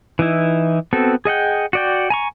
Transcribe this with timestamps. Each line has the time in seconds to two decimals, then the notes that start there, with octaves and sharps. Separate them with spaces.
0.19 E3 D#4 E4
0.93 B3 C4 F#4 A4
1.25 G#4 D#5 F#5 G5
1.73 F#4 D5 G5
2.10 G#5 A#5 C#6